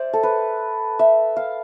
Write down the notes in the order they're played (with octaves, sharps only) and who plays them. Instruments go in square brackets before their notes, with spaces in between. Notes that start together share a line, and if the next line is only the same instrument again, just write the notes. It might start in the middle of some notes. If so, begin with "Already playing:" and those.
Already playing: [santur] C5 D5 E5
A4
B4
E5
F5